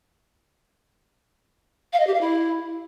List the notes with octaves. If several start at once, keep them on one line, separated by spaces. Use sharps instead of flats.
F5
D#5
G4
F5
E4